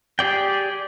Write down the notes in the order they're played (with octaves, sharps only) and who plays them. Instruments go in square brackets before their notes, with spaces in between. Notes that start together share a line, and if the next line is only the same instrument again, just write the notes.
[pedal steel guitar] G4 G#4 D5 G5